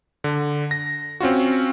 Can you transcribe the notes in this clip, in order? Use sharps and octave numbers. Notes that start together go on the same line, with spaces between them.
D3
A#6
C4 C#4 F4 F#4